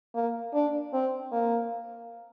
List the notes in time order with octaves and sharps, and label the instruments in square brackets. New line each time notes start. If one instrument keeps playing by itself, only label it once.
[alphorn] A#3
D4
C4
A#3